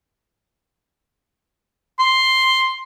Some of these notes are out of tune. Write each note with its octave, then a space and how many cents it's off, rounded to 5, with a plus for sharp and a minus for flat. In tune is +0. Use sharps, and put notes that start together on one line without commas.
C6 +5